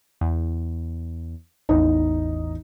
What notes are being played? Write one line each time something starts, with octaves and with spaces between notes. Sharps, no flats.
E2
A1 E2 D#4